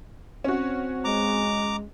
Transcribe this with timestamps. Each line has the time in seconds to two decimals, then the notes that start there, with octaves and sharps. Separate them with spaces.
0.44 C4 C#4 F#4
1.04 G#3 A#5 D6